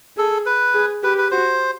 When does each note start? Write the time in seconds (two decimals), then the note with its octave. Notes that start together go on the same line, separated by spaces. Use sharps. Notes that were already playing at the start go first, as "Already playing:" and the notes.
0.17 G#4 A4
0.46 B4
0.75 G#4
1.03 G4 B4
1.18 B4
1.31 F#4 C5